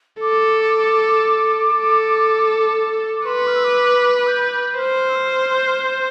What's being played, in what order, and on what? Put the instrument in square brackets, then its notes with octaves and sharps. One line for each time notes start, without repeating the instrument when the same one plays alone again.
[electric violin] A4 [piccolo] D6
[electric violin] A4
[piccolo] D6
[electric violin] B4 [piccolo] C6
[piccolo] F6
E6
D6
D6
G6
G6
[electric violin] C5 [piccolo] F6
[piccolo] E6
F6
G6
F6
G6